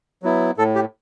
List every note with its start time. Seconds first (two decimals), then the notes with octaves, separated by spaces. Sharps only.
0.23 F#3 B3 E4
0.57 A2 A4
0.75 G4